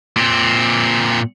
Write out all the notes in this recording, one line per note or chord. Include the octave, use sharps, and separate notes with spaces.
A#2 C4